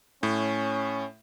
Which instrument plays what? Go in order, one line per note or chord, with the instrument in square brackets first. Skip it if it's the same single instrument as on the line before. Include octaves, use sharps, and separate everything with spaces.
[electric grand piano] A2 [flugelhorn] C#4